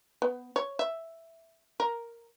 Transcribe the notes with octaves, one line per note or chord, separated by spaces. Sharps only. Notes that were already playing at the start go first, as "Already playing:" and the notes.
B3
C#5
E5
A#4